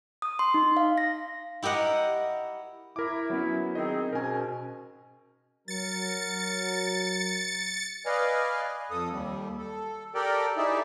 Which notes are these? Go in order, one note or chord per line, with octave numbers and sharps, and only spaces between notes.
D#6
C6
D#4
F5
A#6
E4 G4 A#4 D#5 F#5
E4 A#4 D6
F#3 B3 C#4
D#3 C4 G#4 D#5
G#2 B2 C#4 A#4 G#5
F#3 A#4 A6 C#7
B4 D5 D#5 F5 G#5
F2 A4 D#6
D#2 G3
A4
G4 A4 A#4 D5 G5
D#4 E4 G4 G#4 D5 E5